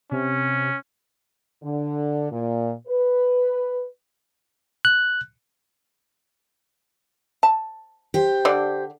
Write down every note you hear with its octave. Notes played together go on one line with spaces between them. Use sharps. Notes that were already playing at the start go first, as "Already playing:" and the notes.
C3 C#4
D3
A#2
B4
F#6
A5
G4 C5
D3 D4 D5